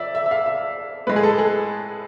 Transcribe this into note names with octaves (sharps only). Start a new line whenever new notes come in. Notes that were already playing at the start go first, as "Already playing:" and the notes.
Already playing: F2 D5 E5
E5
E5
F5
E5
A2 G#3 B4
G#4
A4
G#4